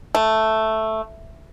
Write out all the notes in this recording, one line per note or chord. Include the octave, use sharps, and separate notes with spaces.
A3